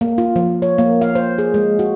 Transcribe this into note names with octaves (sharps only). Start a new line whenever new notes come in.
A#3
F4
F3
C#5
A#3
F5
C5
G#4
G#3
F#4